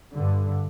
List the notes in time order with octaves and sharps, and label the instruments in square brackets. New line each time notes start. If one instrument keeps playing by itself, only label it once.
[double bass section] G2 D3